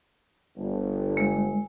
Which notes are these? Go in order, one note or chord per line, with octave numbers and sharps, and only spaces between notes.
G1
G#3